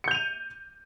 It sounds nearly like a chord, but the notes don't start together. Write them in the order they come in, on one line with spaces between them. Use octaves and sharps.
C#7 G6 F7 D#7